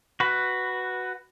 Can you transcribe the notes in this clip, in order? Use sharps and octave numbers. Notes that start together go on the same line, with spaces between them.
F#4 B4